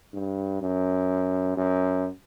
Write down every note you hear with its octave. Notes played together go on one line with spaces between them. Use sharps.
G2
F#2
F#2